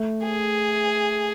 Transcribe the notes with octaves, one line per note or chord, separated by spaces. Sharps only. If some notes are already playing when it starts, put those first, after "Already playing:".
Already playing: A3
G#4